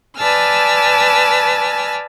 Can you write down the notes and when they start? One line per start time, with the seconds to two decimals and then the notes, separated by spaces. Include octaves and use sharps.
0.18 B4 D5 G#5 A5 E6 F6